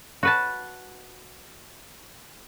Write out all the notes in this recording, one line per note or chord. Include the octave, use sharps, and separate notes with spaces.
F#4 B4 A5